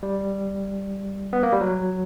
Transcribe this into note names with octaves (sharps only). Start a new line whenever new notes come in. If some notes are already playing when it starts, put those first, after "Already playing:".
G3
B3
A#3
G3
F#3